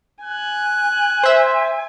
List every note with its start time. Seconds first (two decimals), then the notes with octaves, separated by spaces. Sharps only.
0.23 G#5 F#6
1.23 C5 E5